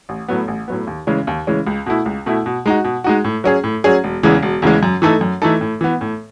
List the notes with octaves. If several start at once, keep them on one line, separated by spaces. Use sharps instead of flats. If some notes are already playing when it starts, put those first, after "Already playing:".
A1
A2 F#3 B3
A1
A2 F#3 B3
D#2
C#3 E3 G#3 C#4
D#2
C#3 E3 G#3 C#4
C#2
B2 A3 E4
C#2
B2 A3 E4
B2
G#3 D#4 F#4
B2
G#3 D#4 F#4
A2
F#3 C#4 G#4
A2
F#3 C#4 G#4
E1
E2 C#3 E3 G#3
E1
E2 C#3 E3 G#3
F#2
E3 A3 D#4 A4
F#2
E3 A3 D#4 A4
A2
E3 B3
A2